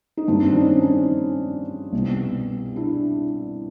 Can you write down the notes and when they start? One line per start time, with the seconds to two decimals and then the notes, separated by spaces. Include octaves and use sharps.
0.17 D#4
0.28 G2 D#3 C4 D4
0.50 D4
0.56 C#4 D#4
0.82 C#4 D#4
1.93 C2 B2
2.76 D4 E4